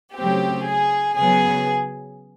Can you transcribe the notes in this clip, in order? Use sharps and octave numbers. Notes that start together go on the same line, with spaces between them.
C#3 F#3 A3 C4 G4
G#4
C#3 F#3 B3 G#4